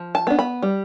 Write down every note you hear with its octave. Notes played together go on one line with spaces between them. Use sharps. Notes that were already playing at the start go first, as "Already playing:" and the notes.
Already playing: F3
A5
B3 D4
B5
G3